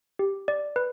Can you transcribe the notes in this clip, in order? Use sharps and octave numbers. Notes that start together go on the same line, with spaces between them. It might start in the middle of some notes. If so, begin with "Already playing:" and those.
G4
D5
B4